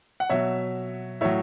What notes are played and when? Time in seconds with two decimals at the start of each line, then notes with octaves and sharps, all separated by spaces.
0.20 F#5
0.30 B2 F#3 C#5 E5
1.21 A2 F#3 C#5 E5